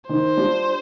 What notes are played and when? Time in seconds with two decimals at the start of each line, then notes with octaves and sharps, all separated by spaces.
0.09 D#3 C5
0.37 G3 D4 F4